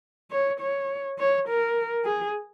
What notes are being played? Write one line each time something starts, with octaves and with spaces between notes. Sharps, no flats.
C#5
C#5
C#5
A#4
G#4